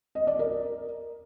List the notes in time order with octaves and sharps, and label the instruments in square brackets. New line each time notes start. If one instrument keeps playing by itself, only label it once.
[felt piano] D#5
D5
A#4